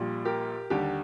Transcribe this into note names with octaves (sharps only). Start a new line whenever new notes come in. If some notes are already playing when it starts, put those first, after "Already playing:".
Already playing: A#1 A#2 G3
G4 A#4
D#2 D3 G3 G4